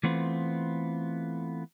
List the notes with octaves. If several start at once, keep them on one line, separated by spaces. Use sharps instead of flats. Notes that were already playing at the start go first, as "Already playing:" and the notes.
E3 A3 B3 C4 F4